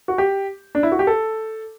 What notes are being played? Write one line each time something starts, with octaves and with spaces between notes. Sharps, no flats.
F#4
G4
D4
E4
F#4
G4
A4